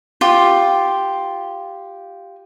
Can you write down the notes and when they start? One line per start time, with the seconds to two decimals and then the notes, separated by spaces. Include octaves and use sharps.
0.21 F4 G4